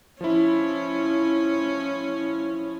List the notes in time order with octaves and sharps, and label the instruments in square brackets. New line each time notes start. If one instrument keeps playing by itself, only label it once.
[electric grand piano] F3 E4 [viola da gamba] C#4